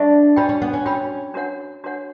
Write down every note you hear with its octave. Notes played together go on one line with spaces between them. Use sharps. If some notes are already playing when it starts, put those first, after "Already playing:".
Already playing: D4 A4 E5 A5 C#6
C#4 F#4 C#5 G5 B5
C#4
B3
C#4
C#4 F#4 C#5 G5 B5
D4 F#4 C#5 F#5
D4 F#4 C#5 F#5